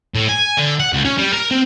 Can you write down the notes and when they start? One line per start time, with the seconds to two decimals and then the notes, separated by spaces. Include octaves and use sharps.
0.15 A2
0.29 G#5
0.57 D3
0.80 F#5
0.93 C#2
1.05 C#4
1.18 G3
1.33 A#4
1.51 C4